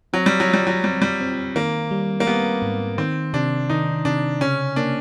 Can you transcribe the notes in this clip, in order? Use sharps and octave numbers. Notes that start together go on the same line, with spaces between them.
F#3 C4
G3
F#3
F4
G3
F#3
G3 C4
G3
C4
D#3 A#3
G3
A#3
G3 B3
G#2
D#3 C4
C3 D4
D#3 D#4
C3 D4
C#3 C#4
A#3 D4